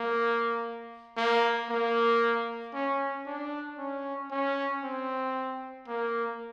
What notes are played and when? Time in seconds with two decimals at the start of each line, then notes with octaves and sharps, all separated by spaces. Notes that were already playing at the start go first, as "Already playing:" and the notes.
Already playing: A#3
1.17 A#3
1.70 A#3
2.74 C#4
3.26 D4
3.78 C#4
4.31 C#4
4.83 C4
5.88 A#3